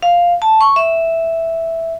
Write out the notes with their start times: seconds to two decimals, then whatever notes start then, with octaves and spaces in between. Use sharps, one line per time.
0.03 F5
0.42 A5
0.61 C#6
0.76 E5